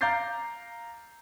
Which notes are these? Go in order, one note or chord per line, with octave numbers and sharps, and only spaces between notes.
F5 A#5 D6 G6 A6 C7